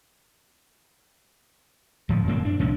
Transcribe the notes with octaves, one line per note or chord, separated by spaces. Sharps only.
D1 F3
F#2 A#2 A#3 C4
D4
C2 A#2 F3 C#4